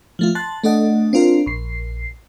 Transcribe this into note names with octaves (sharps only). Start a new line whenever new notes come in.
F3 A3 F4
A5 C6 F#6 A6
A3 D4 A4 D#5 F#5
C4 D4 F4 A#4 C5
A#1 C7